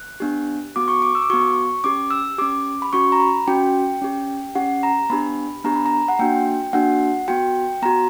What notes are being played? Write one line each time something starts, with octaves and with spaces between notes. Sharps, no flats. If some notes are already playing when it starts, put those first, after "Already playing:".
Already playing: F#6
B3 D4 G4
B3 F#4 D6
C#6
D6
E6
D6
B3 F#4 C#6
C#4 G4 D6
E6
C#4 G4 D6
B5
C#4 F#4 C#6
A#5
B5
C#4 F#4 G5
C#4 G4
C#4 G4 F#5
A#5
B3 D4 G4 B5
B3 D4 G4 A#5
B5
A#5
F#5
A#3 D4 F#4 G5
A#3 D4 F#4 F#5
B3 F#4 G5
B3 F#4 A#5